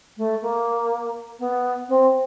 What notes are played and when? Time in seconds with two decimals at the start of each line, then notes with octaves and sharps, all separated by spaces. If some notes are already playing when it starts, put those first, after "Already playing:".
0.17 A3
0.42 A#3
1.39 B3
1.88 C4